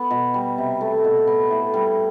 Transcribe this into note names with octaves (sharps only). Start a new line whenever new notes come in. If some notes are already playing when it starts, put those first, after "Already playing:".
Already playing: B3
B2
G3
C3
A3
B2
B3
A2
G3